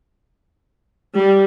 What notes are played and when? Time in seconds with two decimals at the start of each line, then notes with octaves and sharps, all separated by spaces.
1.17 G3